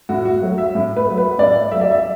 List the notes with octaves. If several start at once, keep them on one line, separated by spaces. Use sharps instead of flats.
A2 F#4
F#4
F#3 A3
E5
A2
B4
F#3 A3
B4
A2 D5
F#3 A3 E5
D5
E5